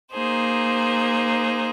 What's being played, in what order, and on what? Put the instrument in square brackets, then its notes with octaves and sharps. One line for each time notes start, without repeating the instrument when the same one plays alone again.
[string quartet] A#3 D#4 G#4 C5